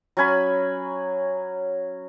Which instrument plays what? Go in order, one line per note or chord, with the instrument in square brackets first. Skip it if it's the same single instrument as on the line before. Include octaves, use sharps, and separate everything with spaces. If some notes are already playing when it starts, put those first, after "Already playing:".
[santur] F#3 C#4 G#5 B5